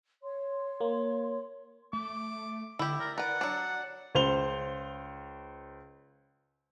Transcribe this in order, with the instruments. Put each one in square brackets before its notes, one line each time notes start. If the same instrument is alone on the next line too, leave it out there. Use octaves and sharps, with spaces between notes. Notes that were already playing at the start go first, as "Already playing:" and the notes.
[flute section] C#5 C6
[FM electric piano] A#3
[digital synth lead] A3 [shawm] D6
[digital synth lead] D3 [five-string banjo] E4 G4
[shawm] A#4 [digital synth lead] D5
[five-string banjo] A#4 B4 [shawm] F#5
[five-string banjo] F#3 D4
[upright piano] C#2 C5 F7 G7